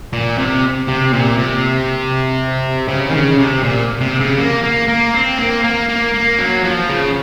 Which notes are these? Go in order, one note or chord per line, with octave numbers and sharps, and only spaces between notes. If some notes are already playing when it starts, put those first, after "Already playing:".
A#2
C3
C3
A#2
C3
C#3
D#3
C#3
C3
A#2
C3
C#3
A#3
A#3
A#3
C4
A#3
A#3
A#3
A#3
F#3
F3
C#3